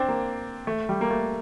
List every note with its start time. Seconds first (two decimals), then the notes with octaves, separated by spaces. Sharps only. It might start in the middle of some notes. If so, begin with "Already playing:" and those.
Already playing: C4 D4
0.08 A#3
0.67 A3
0.89 G3
1.01 A#3
1.11 A3